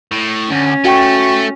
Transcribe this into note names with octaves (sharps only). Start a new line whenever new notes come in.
A2
D2 C#4
A3 F#4 G5 C#6